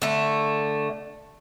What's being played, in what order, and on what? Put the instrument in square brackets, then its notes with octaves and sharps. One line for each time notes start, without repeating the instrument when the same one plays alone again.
[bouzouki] D3 A3